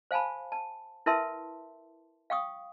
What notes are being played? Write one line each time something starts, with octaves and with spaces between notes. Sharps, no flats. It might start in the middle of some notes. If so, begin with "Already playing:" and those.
C5 F5 G#5 A5 B5
A5
E4 A#4 B4 E5 A5 C6
F5 G5 C#6 D#6